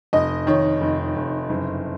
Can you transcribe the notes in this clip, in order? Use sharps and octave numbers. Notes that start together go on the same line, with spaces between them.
F1 D#5
D#3 C#5
F1
F1
F#1